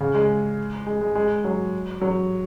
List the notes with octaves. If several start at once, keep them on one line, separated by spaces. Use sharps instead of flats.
C#3
G#3
G#3
G#3
G#3
F#3
F#3